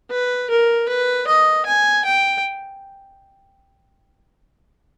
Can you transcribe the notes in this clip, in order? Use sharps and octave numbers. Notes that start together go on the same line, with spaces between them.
B4
A#4
B4
D#5
G#5
G5